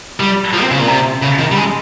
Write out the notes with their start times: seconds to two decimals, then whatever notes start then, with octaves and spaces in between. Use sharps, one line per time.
0.20 G3
0.53 F3
0.62 C4
0.71 C#3
0.80 A#2
0.88 C3
1.22 C#3
1.39 D#3
1.51 G3
1.57 G#3